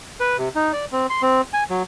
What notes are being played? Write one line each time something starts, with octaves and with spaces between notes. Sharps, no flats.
B4
C3
D#4
D5
C4
C6
C4
G#5
F#3